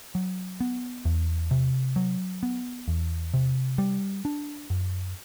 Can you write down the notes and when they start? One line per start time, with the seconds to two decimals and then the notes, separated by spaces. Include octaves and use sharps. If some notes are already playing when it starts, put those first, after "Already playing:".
0.15 F#3
0.61 B3
1.05 E2
1.51 C3
1.96 F#3
2.43 B3
2.88 E2
3.34 C3
3.78 G3
4.25 D4
4.70 F#2